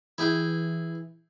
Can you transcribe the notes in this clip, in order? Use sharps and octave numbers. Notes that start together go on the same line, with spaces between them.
E3 E4 G#4 G5